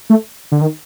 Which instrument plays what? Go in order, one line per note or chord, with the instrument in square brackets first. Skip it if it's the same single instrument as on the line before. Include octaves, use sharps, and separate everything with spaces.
[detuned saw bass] A3
D3
D#3